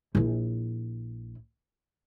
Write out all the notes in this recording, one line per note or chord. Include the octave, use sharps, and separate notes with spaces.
A#1 E4